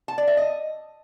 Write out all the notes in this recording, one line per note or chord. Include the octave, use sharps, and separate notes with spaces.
A5
D5
E5
D#5